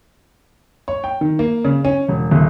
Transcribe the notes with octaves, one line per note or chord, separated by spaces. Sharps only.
C#5
G5
D#3
A#3
C#3
C#4
E1
D#1